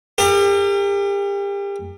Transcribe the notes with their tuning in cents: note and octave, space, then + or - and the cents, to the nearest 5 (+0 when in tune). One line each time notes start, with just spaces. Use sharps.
G4 +35 A#4 -35